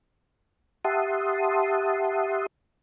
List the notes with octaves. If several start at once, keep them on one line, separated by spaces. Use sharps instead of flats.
G4 E5 F#5 A5 C6 D#6